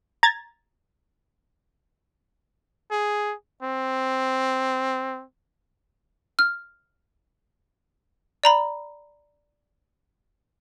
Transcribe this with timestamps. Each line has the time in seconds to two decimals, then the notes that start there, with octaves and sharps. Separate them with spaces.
0.23 A#5 G#6 A6
2.91 G#4
3.63 C4
6.39 F6
8.44 D5 A#5 B5